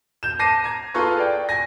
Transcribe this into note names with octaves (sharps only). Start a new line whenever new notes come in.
G6 E7
A5 D6 A#6 C7 D#7
A#5 G#6
F4 G#4 A4 B4 A#5 C#6
D5 G5
G#5 A#6